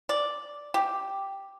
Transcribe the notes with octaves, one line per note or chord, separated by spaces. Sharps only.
D5
G4